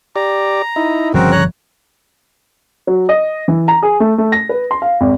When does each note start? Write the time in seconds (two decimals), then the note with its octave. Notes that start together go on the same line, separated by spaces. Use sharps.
0.16 G4 D5 A#5
0.76 D#4 E4
1.14 G1 C#3 F3 G3 C4 F#4 A#4
1.32 C#5 A#5 F#6
2.87 F#3
3.09 D#5
3.48 E3
3.68 A#5
3.83 G#4
4.00 A3
4.18 A3
4.32 A#6
4.49 B4
4.71 C6
4.82 F5
5.01 G#1